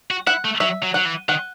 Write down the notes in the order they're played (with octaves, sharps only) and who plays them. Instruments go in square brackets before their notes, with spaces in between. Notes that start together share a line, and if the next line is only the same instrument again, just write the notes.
[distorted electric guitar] F#4
[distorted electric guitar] E4 [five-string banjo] F#5
[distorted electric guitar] A3
[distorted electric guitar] F#3 [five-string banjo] E5
[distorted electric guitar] F#3
[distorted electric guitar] F#3 [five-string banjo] F#5
[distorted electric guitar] E3
[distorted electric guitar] D#3 [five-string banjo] F#5